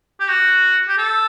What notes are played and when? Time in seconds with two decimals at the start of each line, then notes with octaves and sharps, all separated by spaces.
0.20 G4
0.28 F#4
0.89 G4
0.98 A4